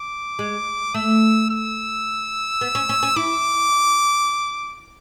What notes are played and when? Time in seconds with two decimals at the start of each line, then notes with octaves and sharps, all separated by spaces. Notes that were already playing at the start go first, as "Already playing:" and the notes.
Already playing: D6
0.39 G#3
0.94 A3 E6
1.50 E6
2.61 B3
2.75 C#4
2.89 C#4
3.03 C#4
3.16 E4 D6